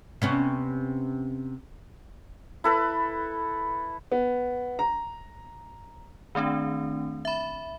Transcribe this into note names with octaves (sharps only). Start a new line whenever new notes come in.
C3 B3 C#4
E4 A4 B4
B3
A#5
D#3 A3 C4 D4
E5 B5